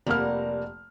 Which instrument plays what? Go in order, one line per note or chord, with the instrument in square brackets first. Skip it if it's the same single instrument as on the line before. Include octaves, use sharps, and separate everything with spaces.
[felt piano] F1 A#3 F6 [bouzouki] G3 A#4 F#5